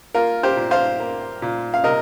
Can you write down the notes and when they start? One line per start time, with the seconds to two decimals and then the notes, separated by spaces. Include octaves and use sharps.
0.14 A#3 F4 A#4
0.43 G4 C5
0.57 A#2
0.71 C5 F5
1.00 A#3
1.42 A#2
1.74 F5
1.84 C3 A#4 D#5